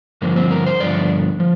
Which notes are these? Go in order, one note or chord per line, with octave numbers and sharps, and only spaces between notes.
G2 D3 F3 A#3
C4
A#4
C5
G2 D3 F3 D5
F3